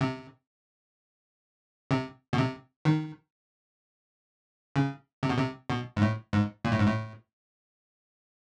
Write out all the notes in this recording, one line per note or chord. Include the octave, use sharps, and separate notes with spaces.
C3
C3
B2
C3
D#3
C#3
C3
B2
C3
B2
G#2
A2
G#2
A#2
A2
G#2
A2